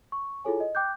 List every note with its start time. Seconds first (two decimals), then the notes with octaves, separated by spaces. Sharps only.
0.12 C#6
0.44 E4 F4 G#4 A4 C#5 G#5
0.60 D#5
0.75 G5 D6 F#6 G6